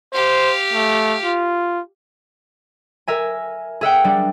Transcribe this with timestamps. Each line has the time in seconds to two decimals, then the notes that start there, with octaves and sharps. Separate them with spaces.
0.13 G4 C5 F5
0.74 A3
1.24 F4
3.08 A#4 E5 G#5
3.81 G#4 E5 F#5 G5
4.04 G3 D4